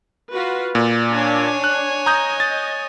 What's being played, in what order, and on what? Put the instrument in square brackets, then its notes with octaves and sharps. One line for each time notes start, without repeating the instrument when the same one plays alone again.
[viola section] F4 F#4 B4
[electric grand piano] A#2 [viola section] D5
[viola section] D4 [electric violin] C#5 G#5
[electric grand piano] F#6
[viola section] D#5 [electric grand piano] A#5 D#6 G6
[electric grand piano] A6